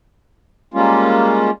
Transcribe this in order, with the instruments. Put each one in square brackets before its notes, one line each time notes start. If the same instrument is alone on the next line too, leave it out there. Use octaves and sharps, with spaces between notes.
[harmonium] G3 G#3 A#3 C#4 F4